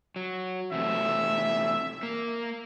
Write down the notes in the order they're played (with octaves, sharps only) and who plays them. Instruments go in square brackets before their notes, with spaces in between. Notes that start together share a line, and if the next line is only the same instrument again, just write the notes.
[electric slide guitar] F#3
[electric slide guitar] E2 C3 A3 [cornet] E5
[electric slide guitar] A#3